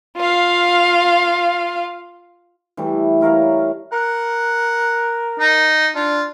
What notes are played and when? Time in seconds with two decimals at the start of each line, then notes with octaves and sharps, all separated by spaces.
0.17 F4 F5
2.77 E3 G3 A3
3.21 E4 A#4 C#5 F5
3.92 A#4 F#5
5.40 D#4
5.95 D4 F4